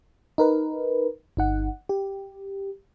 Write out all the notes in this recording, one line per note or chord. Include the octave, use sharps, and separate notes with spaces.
D#4 A#4 B4
G1 D#4 F#5
G4